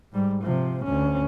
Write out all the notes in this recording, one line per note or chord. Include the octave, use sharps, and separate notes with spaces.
G#2 G3
C3 F3
D2 C#4